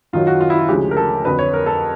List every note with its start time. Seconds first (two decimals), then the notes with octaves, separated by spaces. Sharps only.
0.13 F#2 D#3 F#3 F4
0.27 F#4
0.41 F4
0.50 E4
0.59 F4
0.69 D2 C#3 F3 G#3 G4
0.91 A#4
0.97 A4
1.25 F2 D3 F#3 B4
1.39 C#5
1.54 A#4
1.66 A4